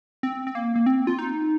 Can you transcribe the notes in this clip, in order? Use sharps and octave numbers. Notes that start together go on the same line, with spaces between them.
C4
C4
A#3
A#3
C4
F4
D#4